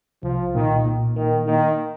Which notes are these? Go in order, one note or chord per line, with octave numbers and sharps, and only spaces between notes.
C2 F3
A#2 D#3
A#2
D#3 A#3
D#3 A#3